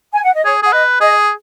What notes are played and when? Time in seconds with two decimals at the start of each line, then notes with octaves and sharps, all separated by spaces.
0.13 G#5
0.23 F#5
0.34 D#5
0.45 G#4 C#5
0.63 G#4 F#5
0.72 B4 D#5
1.01 G#4 D#5